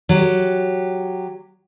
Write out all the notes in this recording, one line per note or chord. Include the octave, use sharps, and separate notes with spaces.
F#3 G4